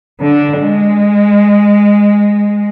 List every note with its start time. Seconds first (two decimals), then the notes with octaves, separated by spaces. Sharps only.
0.21 D3
0.59 G#3